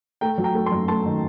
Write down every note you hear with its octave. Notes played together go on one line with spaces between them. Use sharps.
A3 G5 A#5
F#3
G5 A#5
A3
A5 C6
F#2
A3 A5 C6
D#3